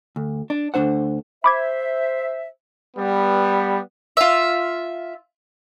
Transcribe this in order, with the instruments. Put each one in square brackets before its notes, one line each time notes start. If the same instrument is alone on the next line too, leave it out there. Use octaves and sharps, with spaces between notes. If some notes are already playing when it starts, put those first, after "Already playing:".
[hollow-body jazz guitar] D2
D4
D2 G2 D4 C5 F#5
[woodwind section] C5 E5 [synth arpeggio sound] B5 D6 G#6
[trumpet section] G3 B3
[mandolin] F4 E5